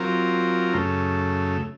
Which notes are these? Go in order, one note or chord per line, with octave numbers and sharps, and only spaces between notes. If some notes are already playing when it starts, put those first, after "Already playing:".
Already playing: F#3 C4 F4 A#4
F#2 C#3 A3